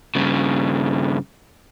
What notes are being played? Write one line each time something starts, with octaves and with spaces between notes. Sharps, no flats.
G2 C#3